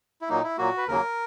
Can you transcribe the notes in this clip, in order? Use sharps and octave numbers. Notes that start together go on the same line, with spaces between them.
E4
A#2 F#3 A#3 D#4
E4
A#2 F#3 A#3 F#4
B4
D#2 C#3 F#3 A#3 A#4